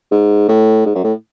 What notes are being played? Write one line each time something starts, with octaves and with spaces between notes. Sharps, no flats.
G#2
A2
G#2
F#2
A2